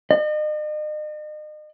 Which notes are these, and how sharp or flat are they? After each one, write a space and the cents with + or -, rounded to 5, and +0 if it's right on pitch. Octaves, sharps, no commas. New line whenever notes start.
D#5 -40